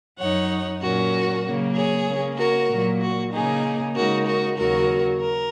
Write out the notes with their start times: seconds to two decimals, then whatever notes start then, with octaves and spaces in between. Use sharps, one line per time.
0.19 F#2 F#3 D#4 C#5 F#5
0.81 A#2 F#3 C#4 F#4 A#4
1.45 C#3 F#3 A#3
1.76 G#4 C#5
2.07 C#3 A#3 C#4
2.38 F#4 A#4
2.70 A#2 F#3 A#3
3.02 F#4
3.33 C#3 A#3 D#4 G#4
3.96 C#3 G#3 D#4 F#4 A#4
4.27 F#4 A#4
4.58 D#2 C#3 F#3 F#4 A#4
5.21 A#4